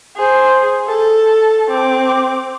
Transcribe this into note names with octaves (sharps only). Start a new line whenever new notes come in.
G#4 C5
A4
C4 D6